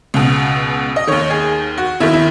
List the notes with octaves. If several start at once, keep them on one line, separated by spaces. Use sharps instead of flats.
C#2 B2
D#5
D#2 D#3 C#5
G#4
F#4
D#2 D#3 E4
E4